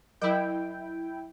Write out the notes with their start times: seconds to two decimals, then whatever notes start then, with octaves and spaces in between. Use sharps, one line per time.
0.22 F#3 E4 A#4 G5